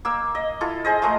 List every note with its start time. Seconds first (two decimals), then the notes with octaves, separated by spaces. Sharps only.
0.05 A#3 E6
0.35 D#5
0.61 E4 F4 A4
0.85 G#4 C5 D#5
1.02 F3 G#3 A3 A#4